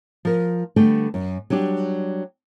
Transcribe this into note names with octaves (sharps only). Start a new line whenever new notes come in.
F3 A#4
D3 G3 A3 B3 G5
F#2
F#3 G3 D4 G4